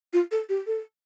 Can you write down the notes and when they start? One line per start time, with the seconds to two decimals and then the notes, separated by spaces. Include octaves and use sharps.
0.13 F4
0.31 A4
0.49 G4
0.67 A4